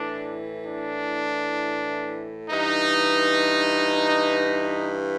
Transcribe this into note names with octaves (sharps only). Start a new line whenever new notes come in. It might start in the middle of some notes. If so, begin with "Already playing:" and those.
Already playing: A2 E3 D4
D4
G2 E3 D#4